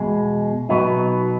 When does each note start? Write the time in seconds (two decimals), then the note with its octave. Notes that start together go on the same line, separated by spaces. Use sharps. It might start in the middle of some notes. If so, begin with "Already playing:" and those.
Already playing: E2 B2 G#3
0.69 B2 F#3 B3 D#4